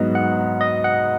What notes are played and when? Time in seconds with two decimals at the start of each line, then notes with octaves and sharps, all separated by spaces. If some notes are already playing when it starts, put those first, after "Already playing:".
Already playing: G#2 F#3 B3 F#4 D#5
0.15 F#5
0.61 D#5
0.84 F#5